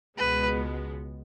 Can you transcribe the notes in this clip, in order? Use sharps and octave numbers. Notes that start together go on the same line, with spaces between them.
C#2 B2 G#3 B3 B4